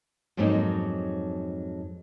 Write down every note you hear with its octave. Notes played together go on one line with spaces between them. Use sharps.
F2 G#2 F#3 A#3 C#4 D#4